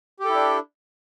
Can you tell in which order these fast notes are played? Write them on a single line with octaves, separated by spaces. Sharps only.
G4 A4 E4 D4